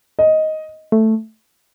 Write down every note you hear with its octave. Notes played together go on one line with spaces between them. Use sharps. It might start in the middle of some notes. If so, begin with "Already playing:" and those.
D#5
A3